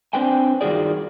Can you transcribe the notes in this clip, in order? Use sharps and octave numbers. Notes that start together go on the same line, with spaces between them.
C4 D4 B4 C5 G5 G#5
G2 D#3 F4 F#4 G#4 D5